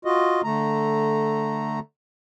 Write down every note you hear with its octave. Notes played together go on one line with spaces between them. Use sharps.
F4 F#4 D#5
D3 A3 A#5